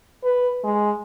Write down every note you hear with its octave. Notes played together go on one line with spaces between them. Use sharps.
B4
G#3